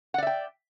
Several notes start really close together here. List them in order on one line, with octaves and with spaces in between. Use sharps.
F#5 D5 E5 G5